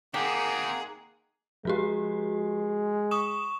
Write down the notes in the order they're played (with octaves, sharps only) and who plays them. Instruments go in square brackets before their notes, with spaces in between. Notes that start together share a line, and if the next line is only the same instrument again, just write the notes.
[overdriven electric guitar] D#3 C4 [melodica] A#3 D#4 F#5 [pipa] G4 [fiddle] G#4
[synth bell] F3 F#4 G4 [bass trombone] G#3
[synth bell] C#6 D#6 E7